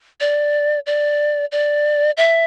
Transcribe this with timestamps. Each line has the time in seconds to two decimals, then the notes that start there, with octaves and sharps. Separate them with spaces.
0.20 D5
0.86 D5
1.52 D5
2.17 E5